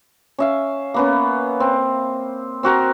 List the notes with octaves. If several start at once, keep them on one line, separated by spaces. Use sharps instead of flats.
C#4 E5 F5
A#3 B3 C#4
C4
C4 F#4 A#4